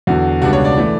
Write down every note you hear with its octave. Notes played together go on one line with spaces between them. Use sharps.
E2 D3 F#3 F#4
C#2 B2 G3 D4 F#4
C#5
D5
E3 A3